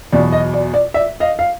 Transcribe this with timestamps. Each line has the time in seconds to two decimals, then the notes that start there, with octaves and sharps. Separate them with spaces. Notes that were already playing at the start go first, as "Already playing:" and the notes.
0.12 E2 B2 F#3 D5
0.32 D#5
0.54 D5
0.74 D5
0.94 D5 E5
1.20 D#5 F5
1.39 F5